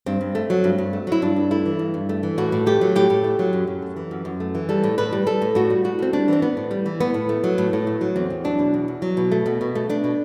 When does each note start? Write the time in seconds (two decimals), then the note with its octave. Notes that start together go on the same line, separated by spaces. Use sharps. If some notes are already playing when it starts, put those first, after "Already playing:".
0.06 G2 C4
0.21 G2
0.35 A3
0.50 F#3
0.64 G2
0.78 G2
0.93 A3
1.07 F#3 E4
1.22 G2 D4
1.36 G2
1.51 A3 E4
1.66 E3
1.79 G2
1.94 G2
2.09 A3
2.23 E3
2.38 A2 F#4
2.52 A2
2.66 A3 G4
2.81 F#3
2.96 A2 G4
3.10 A2
3.24 A3
3.39 F#3
3.53 F#2
3.67 F#2
3.82 A3
3.97 E3
4.11 F#2
4.25 F#2
4.40 A3
4.55 E3
4.69 G3 A4
4.84 A2
4.98 A2 B4
5.13 G3
5.27 G3 A4
5.42 A2
5.55 A2 F#4
5.70 G3
5.84 A2 F#4
5.99 A2 C4
6.13 G3 D4
6.28 E3 C4
6.42 A2 B3
6.57 A2
6.71 G3
6.86 E3
7.00 A2 B3
7.14 A2
7.29 A3
7.44 F#3
7.58 A2
7.73 A2
7.87 A3
8.01 F#3
8.16 E2 C4
8.30 E2
8.44 F#3 D4
8.59 B2
8.74 E2
8.88 E2
9.02 F#3
9.17 B2
9.32 A3
9.46 B2
9.61 B2
9.75 A3
9.89 A3 D4
10.04 B2